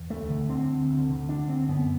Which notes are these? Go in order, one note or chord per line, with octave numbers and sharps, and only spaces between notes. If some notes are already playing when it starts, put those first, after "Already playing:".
Already playing: E2
D2 A3
D3
D3 C4
D2
D2
D3
D3 D4
D2 C4
F#2 B3